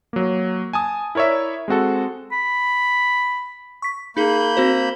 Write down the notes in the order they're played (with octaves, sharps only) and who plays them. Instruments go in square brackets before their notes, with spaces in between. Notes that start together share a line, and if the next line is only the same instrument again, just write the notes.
[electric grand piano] F#3 A#3
G#5 A5 D#6
E4 A#4 C#5 D5 E5
G#3 C4 F#4 A4
[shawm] B5
[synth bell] C#6 B6
[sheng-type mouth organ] A#3 B5 G6 [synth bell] D#4 G#4 F#7
[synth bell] C4 F#4 C5